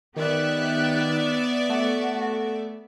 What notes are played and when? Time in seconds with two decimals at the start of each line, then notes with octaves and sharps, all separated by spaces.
0.16 D#3 B3 G4 D5 E5 F#6
1.69 A3 F#4